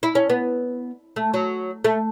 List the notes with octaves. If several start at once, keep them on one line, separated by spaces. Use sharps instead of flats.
E4
C#4
B3
A3
F#3
A3